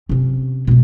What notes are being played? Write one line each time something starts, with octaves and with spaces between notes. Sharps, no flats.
C3 C#4
B2 G#3